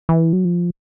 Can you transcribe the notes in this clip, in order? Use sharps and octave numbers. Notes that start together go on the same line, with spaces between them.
E3
F#3
F3